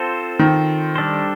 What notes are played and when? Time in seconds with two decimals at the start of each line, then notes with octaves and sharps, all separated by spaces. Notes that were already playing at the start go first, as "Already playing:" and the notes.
Already playing: C4 F4 A4 C5
0.39 D#3
0.96 G3 D4 A4 C5